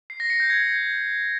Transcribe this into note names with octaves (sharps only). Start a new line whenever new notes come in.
C7
A#6
C#7
G6
G#6